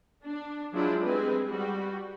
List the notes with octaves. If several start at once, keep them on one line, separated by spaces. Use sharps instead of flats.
D4
F3 F#3 G#3 D4 E4
G3 G#3 C4 G#4 B4
G3 F#4